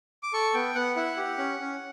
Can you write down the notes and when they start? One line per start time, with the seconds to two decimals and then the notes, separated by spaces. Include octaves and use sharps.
0.23 D6
0.33 A4 C#6
0.54 B3 G5
0.75 B3 F#5
0.96 E4 F#5
1.17 G4
1.38 C#4
1.59 C#4